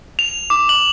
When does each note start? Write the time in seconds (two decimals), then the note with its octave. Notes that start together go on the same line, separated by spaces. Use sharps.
0.19 F7
0.50 D6
0.69 F#7